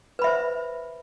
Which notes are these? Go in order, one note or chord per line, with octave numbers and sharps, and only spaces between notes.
B4 C5 E5 B5